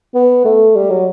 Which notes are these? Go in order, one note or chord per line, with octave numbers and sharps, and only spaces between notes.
B3
A3
G3
F#3